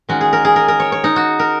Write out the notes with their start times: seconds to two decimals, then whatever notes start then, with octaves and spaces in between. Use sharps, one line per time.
0.09 D#3 G#3 C#4 F#4
0.21 G#4
0.33 A#4
0.45 G#4
0.56 A#4
0.68 A#4
0.80 C#5
0.92 C#5
1.04 D#4
1.16 F#4
1.39 A#4